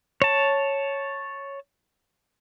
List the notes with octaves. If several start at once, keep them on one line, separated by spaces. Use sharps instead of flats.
C#5 A5